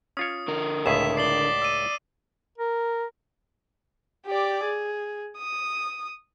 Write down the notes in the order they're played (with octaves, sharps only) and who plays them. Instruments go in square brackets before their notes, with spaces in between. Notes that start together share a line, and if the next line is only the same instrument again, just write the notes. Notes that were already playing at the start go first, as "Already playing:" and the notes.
[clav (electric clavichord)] C#4 F4 C#5 [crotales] D#6
[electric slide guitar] D3 A#4
[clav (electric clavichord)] C#2 A2 G#4 [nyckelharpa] E5 [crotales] B6 E7
[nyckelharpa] D5 [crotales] C7 F#7 G7
[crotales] E6 D#7
[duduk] A#4
[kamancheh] G4 D5
G#4
D#6